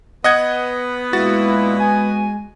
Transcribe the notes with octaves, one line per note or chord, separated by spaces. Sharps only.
B3 D#5 F#5 G#6
A#2 G#3 A#3 E4 F#4 A6
G#5